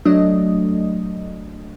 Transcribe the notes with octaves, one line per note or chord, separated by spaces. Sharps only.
F#3 A3 D4 D#5